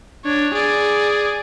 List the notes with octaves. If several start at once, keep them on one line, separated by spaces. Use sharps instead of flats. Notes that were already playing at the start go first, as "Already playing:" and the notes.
D4 C#5
G#4 D5